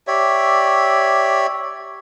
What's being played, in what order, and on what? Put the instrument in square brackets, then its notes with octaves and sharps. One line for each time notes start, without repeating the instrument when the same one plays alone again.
[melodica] G4 C#5 D5 E5